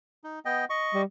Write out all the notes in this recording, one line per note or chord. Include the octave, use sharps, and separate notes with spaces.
D#4
B3 D#5 G5
D#5 C#6
G3